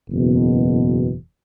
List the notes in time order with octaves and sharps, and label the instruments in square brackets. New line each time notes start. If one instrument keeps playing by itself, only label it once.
[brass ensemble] F#1 E2 B2